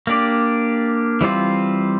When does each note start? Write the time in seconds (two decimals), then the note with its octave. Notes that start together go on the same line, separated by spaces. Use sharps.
0.07 A#3 D4 G4 D5
1.21 E3 G3 C4 F4